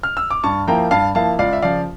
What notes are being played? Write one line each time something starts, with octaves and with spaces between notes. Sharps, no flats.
F6
E6
D6
G2 A5 C#6
F3 A#3 E4 G5 A#5
G2 F5 A5
F3 A#3 E4 F5 A5
C#2 D5 F5
E5
C#3 F3 D5 F5